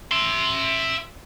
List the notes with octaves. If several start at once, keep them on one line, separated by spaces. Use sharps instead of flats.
E5 C6